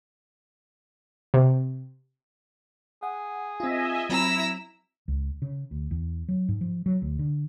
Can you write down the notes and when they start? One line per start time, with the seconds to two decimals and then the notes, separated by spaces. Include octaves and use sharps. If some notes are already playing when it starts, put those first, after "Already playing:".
1.34 C3
3.03 G#4 F#5
3.60 C4 F4 D#5 E5 G#5
4.10 F#3 C4 E4 A#5 E6
5.08 C#2
5.42 C#3
5.71 D2
5.91 E2
6.29 F#3
6.48 G#2
6.61 F3
6.86 F#3
7.02 D2
7.19 D3